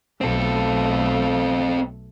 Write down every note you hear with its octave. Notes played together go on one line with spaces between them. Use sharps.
B1 A3 C4 A4